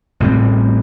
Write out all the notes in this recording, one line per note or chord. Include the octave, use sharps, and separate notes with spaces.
A1 A2 G3 C4